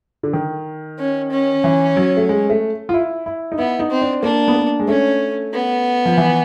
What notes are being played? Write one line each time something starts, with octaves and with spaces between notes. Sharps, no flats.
D3
D#3
C#4
C#4
E3
F#3
A3
G#3
A3
F4
E4
E4
D#4
B3 E4
D#4
C4
D4
A#3 D4
B3
A#3
G#3
A3 C#4
B3
F3
E3